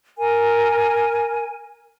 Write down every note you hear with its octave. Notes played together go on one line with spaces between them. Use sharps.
A#4 G#5